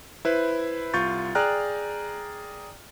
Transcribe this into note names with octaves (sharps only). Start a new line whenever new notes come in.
E4 B4 C5
C2 F4 C#6 G6 A6
G#4 D5 G5 A#5 F6 F#6